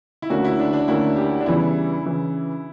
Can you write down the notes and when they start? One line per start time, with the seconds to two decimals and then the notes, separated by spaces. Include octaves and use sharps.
0.22 E4
0.30 D2 D3 A#3 C#4 F#4
0.45 E4
0.59 D4
0.73 D4
0.88 D2 D3 A#3 C#4 E4
1.17 G4
1.41 D4
1.46 E2 C#3 E3 G3 E4
2.05 C#3 E3